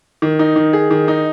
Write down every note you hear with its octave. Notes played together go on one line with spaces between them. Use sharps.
D#3
D#4
D#3
G#4
D#3
D#4